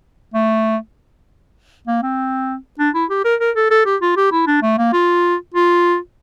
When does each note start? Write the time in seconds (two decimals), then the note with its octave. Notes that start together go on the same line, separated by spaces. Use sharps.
0.34 A3
1.87 A#3
2.03 C4
2.79 D4
2.94 E4
3.10 G4
3.24 A#4
3.40 A#4
3.55 A4
3.71 A4
3.86 G4
4.01 F4
4.17 G4
4.32 E4
4.47 D4
4.62 A3
4.78 A#3
4.93 F4
5.54 F4